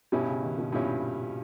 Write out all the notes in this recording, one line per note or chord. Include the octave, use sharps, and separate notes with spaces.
G2 B2 G3 C#4 E4
C#3
D#3
B2
G2 A#2 G3 C#4 E4